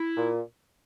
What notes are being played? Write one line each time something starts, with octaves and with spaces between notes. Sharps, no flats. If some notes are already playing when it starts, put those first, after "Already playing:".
Already playing: E4
A#2